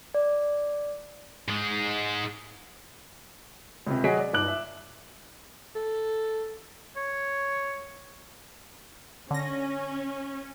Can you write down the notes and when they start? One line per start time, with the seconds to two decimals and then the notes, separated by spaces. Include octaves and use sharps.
0.14 D5
1.48 G#2 G#3
3.87 C#2 C3
4.04 F#3 F#4 G#4 D#5 B6 D7
4.18 D5
4.33 G1 G2 D#4 D6 F#6 F#7
4.48 E5
5.76 A4
6.96 C#5
9.31 D3 C#4 A#6